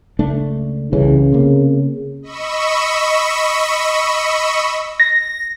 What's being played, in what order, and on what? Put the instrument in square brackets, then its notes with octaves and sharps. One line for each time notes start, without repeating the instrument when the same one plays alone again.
[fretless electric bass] C#2 A3 D4
[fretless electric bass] C2 E3 C#4 [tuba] C#3
[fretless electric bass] C3 A#3
[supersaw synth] D#5 B5 C#6 E6
[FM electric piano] A#6